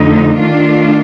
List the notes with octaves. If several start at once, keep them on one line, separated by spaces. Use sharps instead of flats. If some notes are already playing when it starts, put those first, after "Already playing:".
Already playing: F2 D3 A3 D#4
D#3 A3 D4 F4